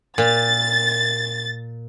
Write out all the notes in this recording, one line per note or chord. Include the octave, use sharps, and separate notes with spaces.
A#2 A6